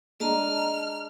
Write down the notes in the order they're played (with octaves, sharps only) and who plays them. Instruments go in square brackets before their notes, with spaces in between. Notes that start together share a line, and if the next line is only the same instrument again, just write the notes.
[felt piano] G#3 D4 [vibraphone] D#5 A5 A#5 [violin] F6